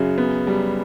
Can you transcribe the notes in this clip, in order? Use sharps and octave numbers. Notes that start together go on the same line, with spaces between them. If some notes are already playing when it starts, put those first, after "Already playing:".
Already playing: F#2 C#3 F#3
B3
G3